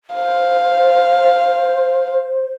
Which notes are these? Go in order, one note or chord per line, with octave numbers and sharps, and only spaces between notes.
C5 F5